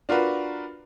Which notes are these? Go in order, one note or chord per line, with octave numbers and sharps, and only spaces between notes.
D4 F4 F#4 A#4 B4